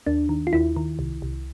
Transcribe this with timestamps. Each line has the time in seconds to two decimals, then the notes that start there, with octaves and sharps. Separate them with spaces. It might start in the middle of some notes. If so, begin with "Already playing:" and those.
0.07 D#2 D4
0.29 D#3
0.47 F4
0.53 D#2 E4
0.76 D#3
0.99 C2
1.22 C2